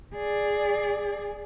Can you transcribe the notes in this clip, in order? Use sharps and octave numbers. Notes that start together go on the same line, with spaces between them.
G#4 D5